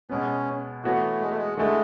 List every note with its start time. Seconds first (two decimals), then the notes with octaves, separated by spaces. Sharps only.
0.09 B2 G#3 B3 C#4
0.84 E3 A3 B3 F#4 C#5
1.21 G#3
1.30 A3
1.37 G#3
1.57 D3 G#3 A3 E4